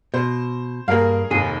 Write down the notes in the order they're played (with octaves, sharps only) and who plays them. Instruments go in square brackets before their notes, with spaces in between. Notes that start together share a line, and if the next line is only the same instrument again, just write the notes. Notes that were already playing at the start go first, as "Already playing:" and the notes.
[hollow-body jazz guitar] B2 [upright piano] C5
[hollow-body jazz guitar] G2 A#3 [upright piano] G#4 A#4 F5
[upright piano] F1 D#2 [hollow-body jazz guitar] G#4